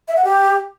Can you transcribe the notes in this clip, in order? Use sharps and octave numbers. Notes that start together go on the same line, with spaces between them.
E5
F#5
G4